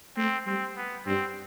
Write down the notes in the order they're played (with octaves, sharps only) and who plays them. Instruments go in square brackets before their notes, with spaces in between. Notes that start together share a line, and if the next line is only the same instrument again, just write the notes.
[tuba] A3 [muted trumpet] C4
[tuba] G3 [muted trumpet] C4
[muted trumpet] B3
[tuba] G2 [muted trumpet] C4